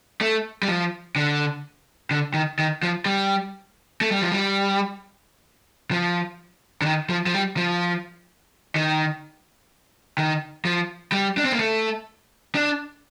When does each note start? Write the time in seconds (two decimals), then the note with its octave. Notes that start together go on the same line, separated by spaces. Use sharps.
0.21 A3
0.63 G3
0.68 F3
1.16 D3
2.11 D3
2.34 D#3
2.59 D#3
2.83 F3
3.06 G3
4.01 A3
4.11 G3
4.22 F3
4.32 G3
5.91 F3
6.82 D3
6.86 D#3
7.10 F3
7.26 F3
7.33 G3
7.57 F3
8.75 D#3
10.18 D#3
10.65 F3
11.12 G3
11.38 D4
11.45 C4
11.52 A#3
11.60 A3
12.55 D4